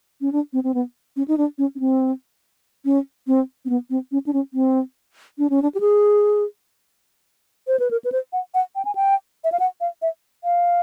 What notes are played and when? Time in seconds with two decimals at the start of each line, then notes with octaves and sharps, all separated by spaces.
0.21 C#4
0.32 D4
0.53 C4
0.64 C4
0.74 B3
1.16 C#4
1.28 D#4
1.38 D4
1.58 C#4
1.75 C#4
1.80 C4
2.85 C#4
3.27 C4
3.65 C4
3.69 B3
3.90 C4
4.12 C#4
4.27 D4
4.33 C#4
4.54 C4
5.38 D4
5.50 C#4
5.62 D4
5.75 G4
5.80 G#4
7.67 C5
7.80 B4
7.91 A#4
8.05 B4
8.12 C5
8.33 F#5
8.54 F#5
8.76 G5
8.85 G#5
8.95 G5
9.44 E5
9.52 F5
9.60 F#5
9.81 F5
10.02 E5
10.44 F5